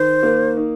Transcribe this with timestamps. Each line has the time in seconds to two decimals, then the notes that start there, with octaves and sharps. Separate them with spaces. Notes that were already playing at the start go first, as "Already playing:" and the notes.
Already playing: D#3 C5
0.23 A#3
0.57 D#4